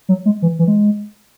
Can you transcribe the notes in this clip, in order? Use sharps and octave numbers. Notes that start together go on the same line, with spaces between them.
F#3
G#3
E3
E3
G#3